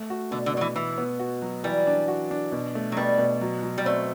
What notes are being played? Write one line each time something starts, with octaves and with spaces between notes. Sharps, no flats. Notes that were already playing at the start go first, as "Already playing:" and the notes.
Already playing: A3
F#4
B2 D3
D3
B2 F#3
E3
E3 B3
B3
F#4
F#3
E3 G3
D4
F#4
D4
B2
A3
F#3
B2 G3
B2
F#3
F#3
G3
A3 C4